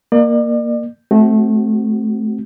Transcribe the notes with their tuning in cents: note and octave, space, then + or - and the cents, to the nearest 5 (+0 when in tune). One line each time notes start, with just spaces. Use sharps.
A#3 +0 D5 +40
A3 -20 C4 +0 F#4 +20